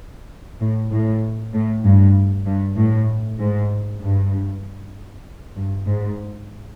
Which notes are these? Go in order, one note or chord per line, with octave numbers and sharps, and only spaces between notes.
A2
A2
A2
G2
G2
A2
G#2
G2
G2
G#2